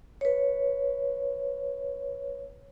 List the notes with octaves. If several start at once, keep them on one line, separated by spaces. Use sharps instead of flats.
B4 C#5